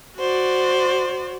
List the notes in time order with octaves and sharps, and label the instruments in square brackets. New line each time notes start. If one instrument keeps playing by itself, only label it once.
[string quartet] F#4 C5 D5